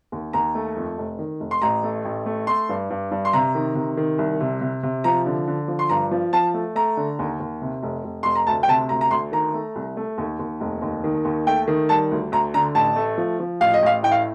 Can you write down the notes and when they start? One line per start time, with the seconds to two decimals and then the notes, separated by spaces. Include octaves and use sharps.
0.12 D#2
0.33 D#2 A#5
0.55 A3
0.77 F2
0.98 F1
1.19 D#3
1.40 F1
1.51 C6
1.62 A1 A#5
1.83 A3
2.05 A1
2.26 A3
2.47 A3 C6
2.69 G2
2.90 G2
3.11 G2
3.25 C6
3.33 C3 A#5
3.55 D#3
3.75 C3
3.97 D#3
4.18 C2
4.40 C3
4.61 C3
4.83 C3
5.04 F3 A#5
5.26 D3
5.47 D3
5.68 F3
5.79 C6
5.89 G2 A#5
6.11 F3
6.33 F3 A5
6.54 A3
6.75 A3 A#5
6.97 D3
7.19 D#2
7.40 D#2
7.62 C3
7.83 F1
8.04 F1
8.23 F1 C6
8.35 A#5
8.47 D2 A5
8.63 G5
8.68 C3 A5
8.89 D2 A#5
9.01 A#5
9.11 D2 C6
9.32 D#3 A#5
9.54 A3
9.75 C2
9.97 A3
10.18 D#2
10.39 D#2
10.60 F1
10.82 D#2
11.04 D#3
11.25 D#2
11.47 A3 G5
11.68 D#3
11.89 G3 A5
12.11 D2
12.32 D2 A#5
12.54 D3 A#5
12.75 A1 A5
12.96 A3
13.18 F3
13.40 F3
13.61 A1 F5
13.74 D#5
13.82 A1 F5
14.03 A2 G5
14.12 F5